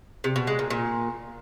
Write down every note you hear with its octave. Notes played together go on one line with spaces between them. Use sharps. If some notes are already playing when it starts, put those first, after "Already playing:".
C3
B2
G#3
A#2
A#2